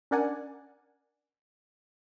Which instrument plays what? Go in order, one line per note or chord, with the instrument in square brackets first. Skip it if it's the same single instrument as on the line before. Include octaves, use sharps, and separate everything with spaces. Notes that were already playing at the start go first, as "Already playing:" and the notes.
[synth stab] C#4 D4 A#4 D5 F#5 G#5